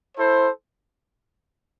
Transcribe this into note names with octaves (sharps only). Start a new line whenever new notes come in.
E4 A4 C5